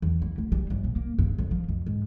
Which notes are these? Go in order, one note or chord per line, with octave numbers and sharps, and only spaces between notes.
E2
E3
D2
G3
G1
A#2
A#3
G2
F2
F3
F2
G#2